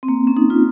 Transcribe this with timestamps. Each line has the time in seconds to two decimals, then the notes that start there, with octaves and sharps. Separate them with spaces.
0.03 C4
0.08 A#3
0.27 C#4
0.37 D#4
0.50 F4